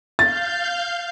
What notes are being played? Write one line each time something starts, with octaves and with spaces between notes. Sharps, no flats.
F5 G6 A6